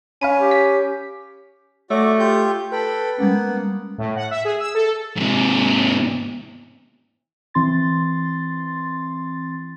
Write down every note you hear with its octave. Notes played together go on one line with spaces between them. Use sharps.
C#4 F5 B5 D#7
G4
B6
A3 F#4 C#5 D5
F4 G4 G6
A4 B4 G5 B5
G3 G#3 A#3 B3 C#4
A2
F#5
E5
G#4
E6
A4
G#2 C3
E3 C4 C6 A6